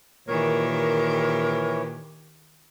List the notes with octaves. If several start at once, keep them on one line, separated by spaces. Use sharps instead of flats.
A#2 D#3 E3 G4 A#4 C#5